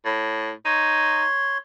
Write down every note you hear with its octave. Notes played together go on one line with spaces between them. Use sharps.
A2
D#4 C#5 C6